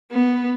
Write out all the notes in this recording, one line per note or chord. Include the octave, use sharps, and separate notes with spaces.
B3